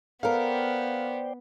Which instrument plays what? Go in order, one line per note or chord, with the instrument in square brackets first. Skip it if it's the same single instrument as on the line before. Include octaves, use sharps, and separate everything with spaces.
[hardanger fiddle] B3 [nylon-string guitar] A4 A#4 [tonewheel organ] C5 D5 G5 [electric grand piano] F5